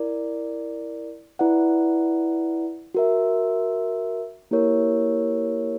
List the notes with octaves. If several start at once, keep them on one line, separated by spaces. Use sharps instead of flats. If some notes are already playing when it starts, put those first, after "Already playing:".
Already playing: E4 A#4 D5
E4 B4 D5 F#5
F#4 A#4 E5
A#3 E4 G4 A#4 C#5